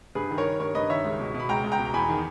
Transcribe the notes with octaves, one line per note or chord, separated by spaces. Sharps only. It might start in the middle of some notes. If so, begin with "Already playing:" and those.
G2 G#4 B4
D#3
A#4 C#5
D#3
G2 A#4 C#5
G2 B4 D#5
D#3 C#5 E5
C#2
B2
B2
B5
C#2 G5 A#5
C#2
G5 A#5
B2
A#5
E2 G#5 B5
D#3